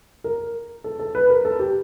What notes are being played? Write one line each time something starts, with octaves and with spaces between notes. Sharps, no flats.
A#4
A4
A4
B4
A#4
A4
G4